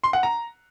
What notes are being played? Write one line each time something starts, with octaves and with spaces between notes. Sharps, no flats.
C6
F#5
A#5